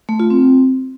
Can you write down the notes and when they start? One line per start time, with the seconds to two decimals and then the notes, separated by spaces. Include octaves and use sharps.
0.09 A3
0.20 F4
0.30 C4